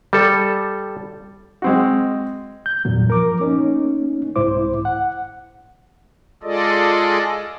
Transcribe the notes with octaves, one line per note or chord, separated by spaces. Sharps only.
G3 A4
G#3 C4 F#4
G6
E2 G2 A#2 F#3
F3 A#4 D6
A#3 C#4 D#4
C2 G#2 E4 C5 D6
F#5
G#3 F4 G#4 A4 D5 D#5